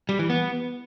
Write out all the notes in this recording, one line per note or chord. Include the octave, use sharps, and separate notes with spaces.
G3
E3
B3